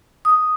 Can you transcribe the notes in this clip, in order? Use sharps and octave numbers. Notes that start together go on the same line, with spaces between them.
D#6